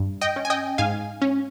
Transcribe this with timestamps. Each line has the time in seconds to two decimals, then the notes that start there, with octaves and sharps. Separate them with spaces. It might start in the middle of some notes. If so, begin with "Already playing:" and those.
Already playing: G2
0.21 D#5 G5
0.36 C#4
0.45 G#5
0.50 D#5 G5
0.78 G#2 F5 G#5
1.22 C#4